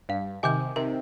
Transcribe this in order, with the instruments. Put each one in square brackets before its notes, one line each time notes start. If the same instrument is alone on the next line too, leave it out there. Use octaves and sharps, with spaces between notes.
[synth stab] G2 [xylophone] F5
[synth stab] C3 D#3 [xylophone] G#5 D6 G6
[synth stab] C3 D#3 [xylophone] A#4